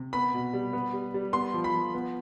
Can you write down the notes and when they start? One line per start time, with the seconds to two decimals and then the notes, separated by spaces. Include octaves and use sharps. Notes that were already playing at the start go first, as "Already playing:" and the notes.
Already playing: C3
0.13 B3 B5
0.34 B2
0.53 G3
0.73 B3
0.93 G3
1.14 G3
1.33 B3 C6
1.54 F3
1.64 B5
1.74 F3
1.94 B3